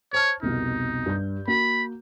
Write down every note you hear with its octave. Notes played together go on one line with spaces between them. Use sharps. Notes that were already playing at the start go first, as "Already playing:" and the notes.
C5 C#5 A5 F6
C2 F2 B2 D#4
G2 G6
A#3 F#4 B5